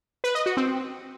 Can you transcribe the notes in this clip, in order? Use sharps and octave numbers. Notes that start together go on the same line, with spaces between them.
B4
D#5
F#4
C4